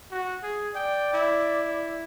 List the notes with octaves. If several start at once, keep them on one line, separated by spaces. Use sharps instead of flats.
F#4
G#4
D5 G5
E4